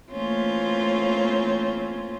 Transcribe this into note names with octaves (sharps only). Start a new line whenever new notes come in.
E3 A3 A#3 C4 C#4 F4